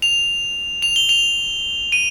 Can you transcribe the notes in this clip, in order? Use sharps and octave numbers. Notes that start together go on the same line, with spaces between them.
F7
F7
G7
F7
D#7